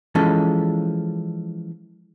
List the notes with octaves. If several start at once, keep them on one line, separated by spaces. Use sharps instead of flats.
E3 F3 G#3 C#4 A4